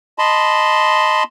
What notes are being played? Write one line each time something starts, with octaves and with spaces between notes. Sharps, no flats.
D#5 A5 B5 C6